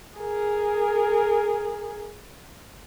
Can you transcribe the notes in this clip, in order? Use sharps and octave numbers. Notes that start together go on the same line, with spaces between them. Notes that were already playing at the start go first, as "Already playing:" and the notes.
G#4 A#4